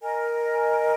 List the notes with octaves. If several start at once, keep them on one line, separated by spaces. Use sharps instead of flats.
A#4 D#5 G#5